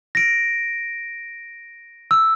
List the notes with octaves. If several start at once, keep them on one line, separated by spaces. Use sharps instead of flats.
A#6 D7
E6